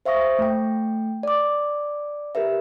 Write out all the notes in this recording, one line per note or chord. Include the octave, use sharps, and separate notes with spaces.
C5 E5 F5 C#6 D#6 A#6
A3 G5
D5 D6
G4 A#4 B4 E5